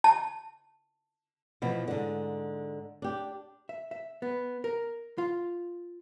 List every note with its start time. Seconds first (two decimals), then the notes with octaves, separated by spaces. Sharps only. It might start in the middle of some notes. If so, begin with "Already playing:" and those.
0.04 A5
1.62 B2 E3 F3
1.88 G#2 D3
3.02 D4 G4
3.69 E5
3.91 E5
4.22 B3
4.64 A#4
5.18 F4